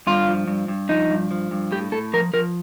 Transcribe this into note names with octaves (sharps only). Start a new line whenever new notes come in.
G2 F4
F3
G2
G2
F3 D#4
G2
F3
G2
A2 G4
A2 A4
F3 A#4
F3 A#4